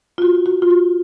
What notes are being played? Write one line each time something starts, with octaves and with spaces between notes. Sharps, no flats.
F4
F#4
F#4
F4
F#4